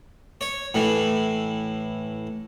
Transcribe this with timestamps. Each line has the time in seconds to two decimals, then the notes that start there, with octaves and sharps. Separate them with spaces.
0.41 C#5
0.74 A2 E3